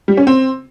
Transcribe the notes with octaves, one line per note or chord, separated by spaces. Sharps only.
G3
C#4
C4